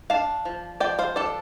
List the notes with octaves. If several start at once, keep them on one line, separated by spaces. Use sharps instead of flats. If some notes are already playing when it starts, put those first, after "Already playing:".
D4 F5 A5
F3
F3 D5 G5
C5 F5
D4 A4 D5